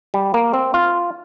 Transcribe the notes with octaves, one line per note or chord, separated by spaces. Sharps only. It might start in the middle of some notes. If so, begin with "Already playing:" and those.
G3
A#3
C4
F4